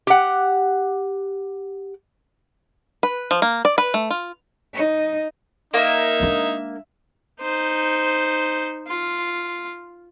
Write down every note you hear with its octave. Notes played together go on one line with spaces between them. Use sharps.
G4 F#5
B4
F3
A#3
D5
B4
A3
F4
D#4
A#3 D#4 E5
G#3 D4
D#4 C5
F4